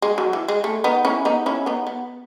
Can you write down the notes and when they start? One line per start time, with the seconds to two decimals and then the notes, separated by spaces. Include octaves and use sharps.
0.02 G#3
0.18 F#3
0.33 E3
0.48 G#3
0.64 A3
0.84 B3 D#4
1.05 C#4 E4
1.25 B3 D#4
1.46 C#4 E4
1.66 B3 D#4
1.87 B3